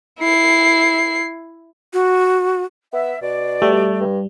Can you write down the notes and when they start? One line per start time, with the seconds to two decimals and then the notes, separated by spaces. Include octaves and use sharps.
0.19 E4 C7
1.93 F#4
2.93 B3 E5
3.22 B2 D5
3.62 G3 A3
4.00 G2